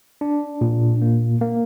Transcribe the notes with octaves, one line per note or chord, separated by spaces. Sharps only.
D4
A#2
A#3
A#3